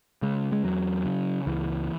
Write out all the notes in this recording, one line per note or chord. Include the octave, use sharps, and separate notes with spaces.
C#3 G#3
G#3
E2 F#3
C#3
C#2 E3